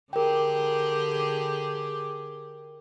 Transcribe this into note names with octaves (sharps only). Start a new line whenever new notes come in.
D3 G4 G#4 A#4 G5